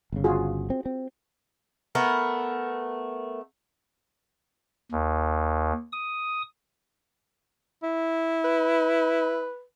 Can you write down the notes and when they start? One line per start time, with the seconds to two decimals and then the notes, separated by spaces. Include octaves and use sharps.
0.12 G1 C#3
0.24 F4 F#4 G#4
0.70 C4
0.86 C4
1.95 A3 B3 A#4
4.92 D#2
5.92 D#6
7.83 E4
8.45 B4